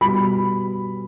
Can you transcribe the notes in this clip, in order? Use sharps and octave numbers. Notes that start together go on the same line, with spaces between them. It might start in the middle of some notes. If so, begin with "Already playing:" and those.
B2 G3 B5